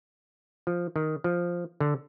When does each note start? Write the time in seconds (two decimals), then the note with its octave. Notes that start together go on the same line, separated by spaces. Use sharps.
0.67 F3
0.96 D#3
1.24 F3
1.80 D3